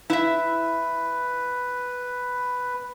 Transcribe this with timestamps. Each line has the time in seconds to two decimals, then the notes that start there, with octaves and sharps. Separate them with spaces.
0.10 E4 B4 E5